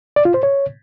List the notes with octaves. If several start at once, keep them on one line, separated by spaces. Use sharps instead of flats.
D5
F4
C5
C#5